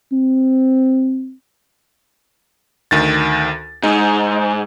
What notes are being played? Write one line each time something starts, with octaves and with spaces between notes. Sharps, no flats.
C4
D2 D#3 A6
G#2 D#4